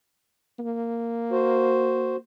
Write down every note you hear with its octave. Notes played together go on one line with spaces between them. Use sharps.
A#3
F#4 C5